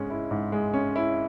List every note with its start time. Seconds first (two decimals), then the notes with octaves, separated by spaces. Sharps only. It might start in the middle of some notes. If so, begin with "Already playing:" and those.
Already playing: G#2 G#3 C#4
0.10 E4
0.31 G#2
0.52 G#3
0.74 C#4
0.96 E4